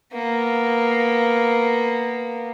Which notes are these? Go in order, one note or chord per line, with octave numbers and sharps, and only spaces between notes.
A#3 B3